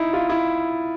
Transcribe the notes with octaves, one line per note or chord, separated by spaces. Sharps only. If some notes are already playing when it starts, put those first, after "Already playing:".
Already playing: D#4 E4
F4
E4